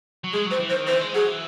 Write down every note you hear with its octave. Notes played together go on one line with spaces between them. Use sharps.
F#3
G#3 G#4
F#3 C5
E3
C5
D#3
E3 C5
G#3
F#3 G#4
E3